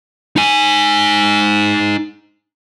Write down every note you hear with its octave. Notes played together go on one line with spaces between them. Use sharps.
D#4 G#5